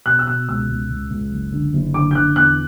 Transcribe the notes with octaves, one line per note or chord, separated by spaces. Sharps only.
B2 F#6
E6
B2 F#6
C#2 E6
C#2
C#2
C#2
F#1
D3
F#1
D3 D6
G6
D3 F#6
E2 F#6